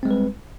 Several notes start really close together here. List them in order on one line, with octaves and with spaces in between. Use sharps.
C4 G#3 G3 B4